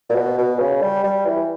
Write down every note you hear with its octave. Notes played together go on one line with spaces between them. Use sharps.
A#2
B2
B2
C#3
G3
G3
E3